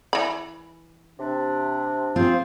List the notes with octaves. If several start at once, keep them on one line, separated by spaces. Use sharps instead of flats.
E3 B5
C3 D4
C4 F4 G#4 C5